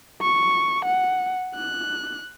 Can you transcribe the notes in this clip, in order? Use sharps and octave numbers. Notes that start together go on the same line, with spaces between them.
C#6
F#5
F#6